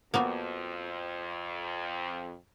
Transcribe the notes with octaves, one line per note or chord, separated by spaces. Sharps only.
F2 A#3 B3 F#4